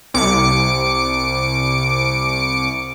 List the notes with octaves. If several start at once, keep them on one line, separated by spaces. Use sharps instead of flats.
C2 D6 C#7